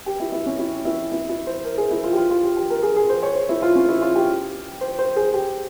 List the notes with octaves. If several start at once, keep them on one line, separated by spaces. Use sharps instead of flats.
G4
E4
E4
C#4
E4
E4
E4
E4
C5
A#4
G#4
E4
F4
G4
F4
F4
G4
G4
A#4
G#4
G#4
C5
C#5
C5
E4
F4
C#4
E4
F4
G4
C5
C5
G#4
G4